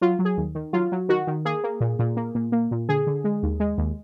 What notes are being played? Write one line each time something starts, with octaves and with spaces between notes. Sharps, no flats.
F#3 F4
F#3
G#4
D#2
D#3
F#3 F4
F#3
D#3 F#4
D#3
A#3 G#4
A#3
A#2
A#2
A#3
A#2
A#3
A#2
D3 G#4
D3
G#3
D#2
G#3
D#2